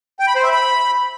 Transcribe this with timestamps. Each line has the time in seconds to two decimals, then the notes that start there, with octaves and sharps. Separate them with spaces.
0.19 G5
0.27 B5
0.35 C5
0.43 E5
0.51 B5